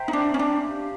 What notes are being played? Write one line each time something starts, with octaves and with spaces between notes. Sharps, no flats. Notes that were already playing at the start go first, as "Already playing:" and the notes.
Already playing: C5 E5 G5 A#5
D#4
D4
C#4
D4
G4 C5 F5